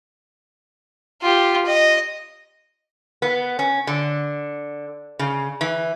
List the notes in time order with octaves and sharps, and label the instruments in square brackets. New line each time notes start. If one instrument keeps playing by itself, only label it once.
[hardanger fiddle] F4 G4
D#5
[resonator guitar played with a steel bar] B3
C#4
D3
C#3
E3